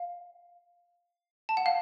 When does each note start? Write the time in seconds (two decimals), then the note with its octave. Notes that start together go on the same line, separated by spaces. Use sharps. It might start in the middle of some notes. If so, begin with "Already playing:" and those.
Already playing: F5
1.49 A5
1.57 F#5
1.66 F5